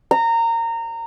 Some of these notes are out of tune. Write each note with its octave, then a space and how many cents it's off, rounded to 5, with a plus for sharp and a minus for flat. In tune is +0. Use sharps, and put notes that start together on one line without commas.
A#5 -20